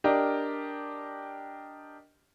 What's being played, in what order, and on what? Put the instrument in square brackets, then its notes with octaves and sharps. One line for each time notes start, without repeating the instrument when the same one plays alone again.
[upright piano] D4 G4 A#4 D#5